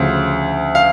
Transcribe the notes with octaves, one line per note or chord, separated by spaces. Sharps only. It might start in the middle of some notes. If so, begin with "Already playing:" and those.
Already playing: D2 C#3 F3
F5